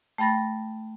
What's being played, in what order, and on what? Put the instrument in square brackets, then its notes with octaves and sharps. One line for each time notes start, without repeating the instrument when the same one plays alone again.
[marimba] A3 G5 B5 A6 A#6